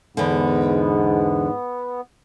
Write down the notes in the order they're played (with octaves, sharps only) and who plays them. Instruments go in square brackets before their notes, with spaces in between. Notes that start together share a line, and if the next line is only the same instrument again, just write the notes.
[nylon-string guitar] E2 D3 [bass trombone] G#2 [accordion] B3